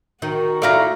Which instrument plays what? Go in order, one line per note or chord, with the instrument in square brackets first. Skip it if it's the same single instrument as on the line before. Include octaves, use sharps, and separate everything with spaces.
[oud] D#3 [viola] F#4
[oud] A3 E4 F4 [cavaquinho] D5 F5 A#5